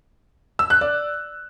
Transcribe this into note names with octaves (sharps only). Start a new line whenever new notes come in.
E6
F#6
D5